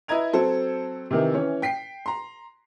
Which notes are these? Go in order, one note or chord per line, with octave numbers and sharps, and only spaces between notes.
E4 B4 D#5 A#5 G#6 F7
F#3 C4 A4 C5
C3 D#3 E3
E3 C#4 C#5
G5 B6 C7
A#5 C6